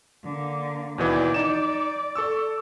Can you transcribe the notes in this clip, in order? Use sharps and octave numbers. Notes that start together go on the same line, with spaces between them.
D3 A#3
D#2 B2 E3 D5
D#4 E7
A4 C#6 E6